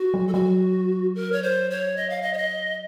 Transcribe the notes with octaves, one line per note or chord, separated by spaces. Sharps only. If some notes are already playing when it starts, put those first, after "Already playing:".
Already playing: F#4
F#3
A4
F#3 F#4
A#4
C#5
C5
C#5
D#5
F5
D#5
C#5
D#5